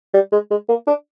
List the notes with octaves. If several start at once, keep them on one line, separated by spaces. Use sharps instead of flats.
G3
G#3
G#3
A#3
D4